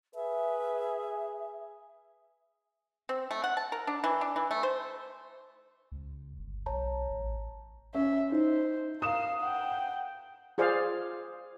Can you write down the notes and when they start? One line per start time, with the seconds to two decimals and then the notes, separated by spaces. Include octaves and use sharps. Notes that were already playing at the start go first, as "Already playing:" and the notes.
0.15 G#4 B4 E5
3.09 C4
3.31 A3
3.44 F#5
3.57 A5
3.72 A#4
3.87 D4
4.04 E3
4.21 D4
4.36 E3
4.51 A3
4.63 C5
5.92 C#2
6.39 G1
6.66 B1 C#5 A5 A#5
7.10 A1
7.94 C#4 E5
8.32 D#4 C5
9.02 A#4 F5 D#6 E7
9.41 F#5 G5
10.58 F4 G#4 C5 D5 F5